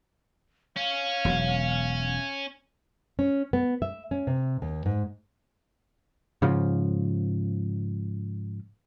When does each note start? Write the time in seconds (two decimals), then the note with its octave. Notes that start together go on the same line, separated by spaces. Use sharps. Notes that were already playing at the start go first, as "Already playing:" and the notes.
0.77 C#4 F5
1.25 E1 B2 F#3
3.19 C#4
3.53 B3
3.82 E5
4.11 C#4
4.27 C3
4.62 D#2
4.86 G#2
6.42 G#2 C#3 F3